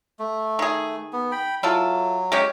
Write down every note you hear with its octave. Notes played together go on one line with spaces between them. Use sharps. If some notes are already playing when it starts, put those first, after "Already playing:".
A3
D#3 G#4
B3
G5 B5
F#3 E4 F4 A4
G#3 C#4 G4